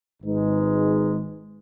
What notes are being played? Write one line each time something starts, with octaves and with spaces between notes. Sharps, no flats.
G#1 G#2 G#3 D#4 B4